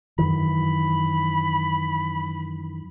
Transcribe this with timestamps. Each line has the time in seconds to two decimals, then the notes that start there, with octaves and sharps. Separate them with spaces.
0.18 F#2 D#3 E3 B5